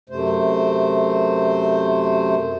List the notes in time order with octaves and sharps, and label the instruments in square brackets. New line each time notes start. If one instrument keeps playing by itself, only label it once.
[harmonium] F#2 C3 A3 C5